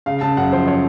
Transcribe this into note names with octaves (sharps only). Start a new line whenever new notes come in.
C#3 F5
C#3 A5
F#2 F#5
F3 C5
C#5